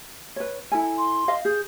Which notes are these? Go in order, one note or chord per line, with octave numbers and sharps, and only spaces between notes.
B4 C#5
E4 A4 G#5
C6
D#5 F5
G#4 G6